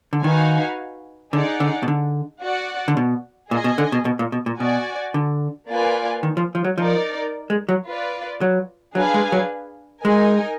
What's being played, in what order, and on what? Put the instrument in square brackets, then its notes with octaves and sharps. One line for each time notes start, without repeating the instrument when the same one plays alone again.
[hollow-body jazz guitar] D3
[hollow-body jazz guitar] D#3 [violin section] D#4 F#4 B4 F5 G#5
[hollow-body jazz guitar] D3 [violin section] D#4 G#4 D5 F#5
[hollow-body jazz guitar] D3
B2
D3
[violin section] F#4 D5 F#5
[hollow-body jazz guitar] D3
B2
[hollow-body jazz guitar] A#2 [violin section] G#4 D#5 G#5
[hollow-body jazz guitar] B2
D3
B2
B2
A#2
B2
A#2
[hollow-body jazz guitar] B2 [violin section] F#4 D5 G#5
[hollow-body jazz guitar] D3
[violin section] A#3 F4 B4 D5 G#5
[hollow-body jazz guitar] D#3
F3
F3
F#3
[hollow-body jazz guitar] F3 [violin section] D#4 A#4 D5
[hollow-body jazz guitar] G#3
F#3
[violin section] F4 B4 D5
[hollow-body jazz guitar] F#3
[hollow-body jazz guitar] F#3 [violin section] D4 G#4 B4 F5 G#5
[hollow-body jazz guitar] G#3
F#3
[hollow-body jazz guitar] G#3 [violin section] D#4 A#4 D#5 G#5